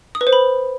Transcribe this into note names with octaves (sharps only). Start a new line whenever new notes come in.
D#6
B4
C5
B5